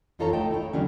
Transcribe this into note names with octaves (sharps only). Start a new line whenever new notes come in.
F2 D#4 F4 A4 C#5 A#5
A3 D#4 A4 D#5 G5
E4 C#5
D3 D#3 F#3 G3 C#4